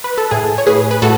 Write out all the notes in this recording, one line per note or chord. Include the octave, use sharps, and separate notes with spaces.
B4
A4
A2 G#4
C#5
A2 G#4 B4
B4
A2 F#4 A4